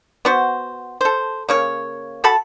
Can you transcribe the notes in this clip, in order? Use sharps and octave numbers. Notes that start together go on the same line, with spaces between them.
B3 F#4 C5
A4 C5
C#3 A#3 C#5
F#4 A4 A5 B5